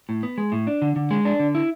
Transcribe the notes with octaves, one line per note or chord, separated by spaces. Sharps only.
A2
B3
G#3
A2
D4
D3
D3
G#3
D4
D3
E4